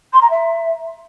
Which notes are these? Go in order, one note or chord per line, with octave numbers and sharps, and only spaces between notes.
C6
A#5
E5